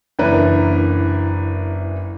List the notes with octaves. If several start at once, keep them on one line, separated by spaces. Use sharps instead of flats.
F#1 E3 D4 E4 A#4 B4